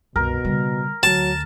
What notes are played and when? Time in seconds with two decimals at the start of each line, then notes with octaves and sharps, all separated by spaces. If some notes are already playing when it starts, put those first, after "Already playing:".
0.16 C2 F#2 B2 A#4
0.45 C#3 G3
1.03 D2 F#3 A5